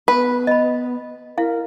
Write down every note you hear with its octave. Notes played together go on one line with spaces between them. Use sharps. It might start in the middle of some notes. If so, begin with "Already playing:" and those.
B3 B4
D#5 B5
E4 A#4 F5